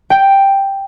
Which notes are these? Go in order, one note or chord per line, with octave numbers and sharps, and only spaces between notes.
G5